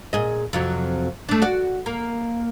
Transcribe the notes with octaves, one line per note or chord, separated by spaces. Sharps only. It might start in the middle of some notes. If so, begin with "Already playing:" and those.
A#2 G#4 D#5
F2 C3 F#3
A3 D4
F#4 D5
A#3